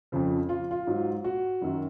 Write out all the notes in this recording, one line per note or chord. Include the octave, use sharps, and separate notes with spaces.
F2 C#3 F3
F4
F4
G#2 F#3
F#4
F#2 D#3 F#3